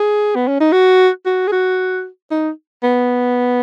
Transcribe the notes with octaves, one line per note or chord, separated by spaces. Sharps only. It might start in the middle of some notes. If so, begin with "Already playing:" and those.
Already playing: G#4
B3
C#4
D#4
F#4
F#4
G#4
F#4
D#4
B3